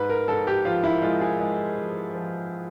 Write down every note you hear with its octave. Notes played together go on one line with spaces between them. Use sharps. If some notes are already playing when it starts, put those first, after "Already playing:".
Already playing: G#2 B4
A#4
G#2 A4
G4
F3 F4
E4
G#3 F4
G#4
G#3
F3
F3